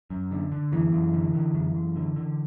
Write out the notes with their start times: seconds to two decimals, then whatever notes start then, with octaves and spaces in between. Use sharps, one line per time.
0.10 F#2
0.31 D3
0.52 D3
0.72 F#2 E3
0.93 F#2
1.13 D3
1.34 D3
1.54 F#2
1.75 F#2
1.96 D3
2.16 D3